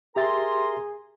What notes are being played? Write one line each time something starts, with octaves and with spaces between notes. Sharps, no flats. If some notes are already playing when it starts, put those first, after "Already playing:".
G4 G#4 A#4 E5 A#5 C6 A6